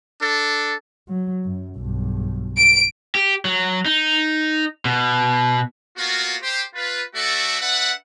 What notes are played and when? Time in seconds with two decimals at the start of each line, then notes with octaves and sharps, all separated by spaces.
0.21 D4 A4
1.08 F#3
1.44 F#2
1.77 B1 G2
2.57 D7
3.15 G4
3.45 F#3
3.86 D#4
4.85 B2
5.98 A#3 B3 F4 F#4
6.42 G4 C5
6.75 F4 B4
7.15 A3 F#4 A4 D5 E5
7.61 D4 B4 E5 F#5